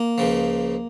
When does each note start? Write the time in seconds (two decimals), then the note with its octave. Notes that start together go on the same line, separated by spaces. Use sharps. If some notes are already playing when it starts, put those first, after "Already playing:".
Already playing: A#3
0.18 C#2 C#3 F3